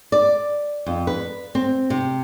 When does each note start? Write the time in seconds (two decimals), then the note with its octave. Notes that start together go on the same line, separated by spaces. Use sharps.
0.12 D5
0.86 F2
1.07 B4
1.55 C4
1.90 C3